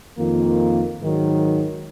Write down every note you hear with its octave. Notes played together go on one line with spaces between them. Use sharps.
F2 D#3 A#3 F4
G#2 D#3 F#3